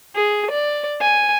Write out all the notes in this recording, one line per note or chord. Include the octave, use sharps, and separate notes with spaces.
G#4
D5
G#5